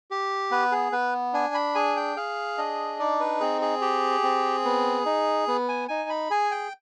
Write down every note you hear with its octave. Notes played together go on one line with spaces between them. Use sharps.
G4
B3 B4
G#4
B3 B4
D4 G#5
B5
G#4 G#5
G5
G#4 F5
D4 D#5
D#4 D5
B4
C4 G#4
G#4
G4
C4
B3
D#4
B3
G#5
D#4 G#5
B5
G#4 G#5
G5